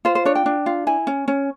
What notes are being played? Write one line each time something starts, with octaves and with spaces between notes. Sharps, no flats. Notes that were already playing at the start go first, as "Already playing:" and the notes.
F4 C5
C5
D4 C#5
G5
D4
F4
E4 G#5
C#4
C#4